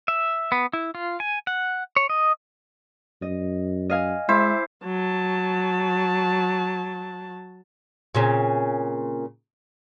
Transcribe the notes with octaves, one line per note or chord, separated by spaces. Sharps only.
E5
B3
E4
F4
G#5
F#5
C#5
D#5
F#2 D#5
D#5 F5 G#5
G#3 E4 C5 E5 D6
F#3 A5
A#2 C#3 C4